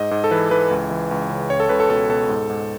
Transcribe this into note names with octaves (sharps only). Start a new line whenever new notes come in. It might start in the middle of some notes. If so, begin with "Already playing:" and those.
Already playing: G#2 D#5
G#2
A4
E3 B4
E3 B4
C#2
E3
C#2
C#3
C#2 C#5
A4
C#2 B4
A4
B2 A4
B2 A4
G#2
G#2